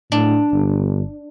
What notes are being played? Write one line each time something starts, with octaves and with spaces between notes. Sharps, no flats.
A2 D4
G1